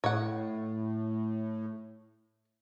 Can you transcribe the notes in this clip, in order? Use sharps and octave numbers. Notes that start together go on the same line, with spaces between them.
A2 C#5 F#5